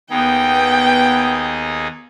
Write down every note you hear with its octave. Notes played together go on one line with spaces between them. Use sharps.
D#2 B3 D#4 G#4 G5